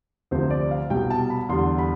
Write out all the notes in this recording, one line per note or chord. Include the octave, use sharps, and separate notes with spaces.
D2 C3 F3 C5
D5
F5
C2 B2 G3 G5
A5
B5
E2 D3 G3 C6
B5